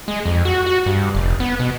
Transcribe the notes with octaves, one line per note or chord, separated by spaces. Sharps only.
G#3
F2
F#4
F#4
G2
F1
B3
B2